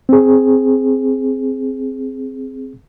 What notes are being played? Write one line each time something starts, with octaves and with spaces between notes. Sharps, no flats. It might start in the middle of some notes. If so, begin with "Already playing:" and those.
C4 G#4